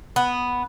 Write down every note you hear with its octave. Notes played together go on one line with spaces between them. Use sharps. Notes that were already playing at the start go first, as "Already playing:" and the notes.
B3